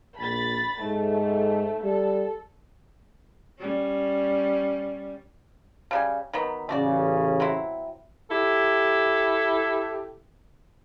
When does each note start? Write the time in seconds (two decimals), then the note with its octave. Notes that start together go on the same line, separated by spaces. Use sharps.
0.18 A#1 B5 A6
0.81 G#2 A3
1.84 G3 A4
3.58 G3 C#4
5.91 C#3 G3 G#5
6.33 D#3 F#3 B3
6.69 A1 C#3 A3 F#4 D5
7.40 F#3 C4 E4
8.31 E4 G4 A4